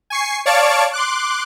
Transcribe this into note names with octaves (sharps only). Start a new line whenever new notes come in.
G#5 C#6 C7
C#5 D5 F5 A5 C#6 D7
C6 D6 F#6